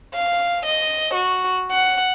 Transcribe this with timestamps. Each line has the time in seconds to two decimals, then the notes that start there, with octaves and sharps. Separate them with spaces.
0.14 F5
0.66 D#5
1.14 F#4
1.71 F#5